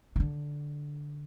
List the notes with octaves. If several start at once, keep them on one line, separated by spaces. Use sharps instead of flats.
E3
D3